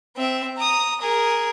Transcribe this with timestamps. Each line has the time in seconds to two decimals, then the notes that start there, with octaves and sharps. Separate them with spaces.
0.16 C4 E5
0.58 A#5 D#6
1.01 G#4 A#4